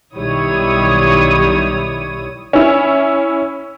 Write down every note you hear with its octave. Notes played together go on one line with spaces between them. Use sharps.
B1 D#3 G3 E4 C#5 D#6
C#4 E4